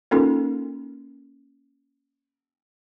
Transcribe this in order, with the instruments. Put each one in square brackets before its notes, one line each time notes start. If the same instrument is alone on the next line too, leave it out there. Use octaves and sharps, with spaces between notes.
[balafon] A#3 C#4 D#4 F4 A4 A#4